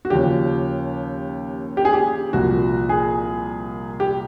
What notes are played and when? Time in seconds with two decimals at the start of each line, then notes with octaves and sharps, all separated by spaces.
0.05 F#4
0.10 D#2 C#3 F3 G4
1.77 G4
1.85 G#4
1.93 G4
2.33 C2 A#2 F3 F#4
2.89 G#4
4.00 G4